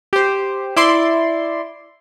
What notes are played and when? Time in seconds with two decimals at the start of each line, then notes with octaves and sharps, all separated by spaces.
0.13 G4 C5
0.76 E4 D5 C6